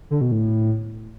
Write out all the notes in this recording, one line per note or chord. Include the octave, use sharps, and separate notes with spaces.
D3
B2
A2